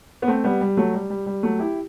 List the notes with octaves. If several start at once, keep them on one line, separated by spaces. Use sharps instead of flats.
B3
A3 C4
G3 B3
G3
F#3 A3
G3
G3
G3
F#3 A3
E4 G4